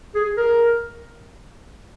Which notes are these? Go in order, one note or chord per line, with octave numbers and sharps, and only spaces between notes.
G#4
A#4